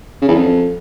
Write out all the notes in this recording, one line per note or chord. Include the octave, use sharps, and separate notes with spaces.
C#3
E2
F2